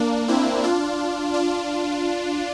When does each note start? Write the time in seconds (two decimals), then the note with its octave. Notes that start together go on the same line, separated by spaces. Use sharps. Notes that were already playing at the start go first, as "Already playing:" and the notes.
Already playing: A#3 D4
0.28 C4 E4
0.64 D4 F4
1.34 D4 F4